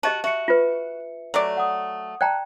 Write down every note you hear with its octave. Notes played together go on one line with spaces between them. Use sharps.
F#4 G4 D#5 A5
F#4 E5 C#7
F4 B4
F#3 A3 D5
F#5 D#6
D5 G5 A5 A#5 F#6